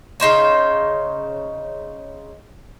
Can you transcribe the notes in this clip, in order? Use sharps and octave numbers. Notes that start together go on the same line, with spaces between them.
C#3 D#4 C5 C#5